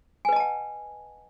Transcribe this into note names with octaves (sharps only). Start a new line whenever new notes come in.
B4 D#5 F#5 G#5 A5